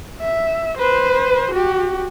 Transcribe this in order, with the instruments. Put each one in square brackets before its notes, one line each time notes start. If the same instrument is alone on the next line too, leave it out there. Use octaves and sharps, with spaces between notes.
[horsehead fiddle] E5
B4 C5
F#4 G4